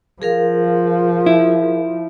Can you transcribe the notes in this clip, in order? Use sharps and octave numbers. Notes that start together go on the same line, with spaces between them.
F3 G#4 A#4 F5
E4